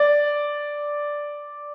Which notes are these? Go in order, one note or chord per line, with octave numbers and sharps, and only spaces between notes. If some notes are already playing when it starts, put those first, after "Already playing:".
Already playing: D5